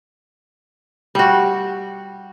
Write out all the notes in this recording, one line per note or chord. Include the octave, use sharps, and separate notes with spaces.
G3 F#4